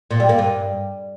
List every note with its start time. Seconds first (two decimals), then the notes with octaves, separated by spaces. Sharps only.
0.11 A#2
0.20 G3
0.29 A#3
0.38 G2